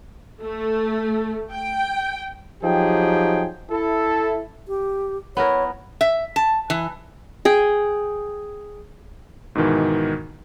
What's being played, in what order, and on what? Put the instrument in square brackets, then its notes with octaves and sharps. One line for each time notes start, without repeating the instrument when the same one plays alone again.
[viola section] A3
G5
[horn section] F3 F#3 D#4 G4 G#4 G5
E4 A4
[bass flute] G4
[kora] B3 E4 A#4 [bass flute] C#5
[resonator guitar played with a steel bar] E5
A5
E3
[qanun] G#4 G5
[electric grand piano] G#2 B2 D#3 E3